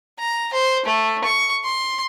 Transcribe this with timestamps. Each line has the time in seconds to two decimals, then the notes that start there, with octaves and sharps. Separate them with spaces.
0.19 A#5
0.53 C5
0.86 A3
1.24 C#6
1.64 C6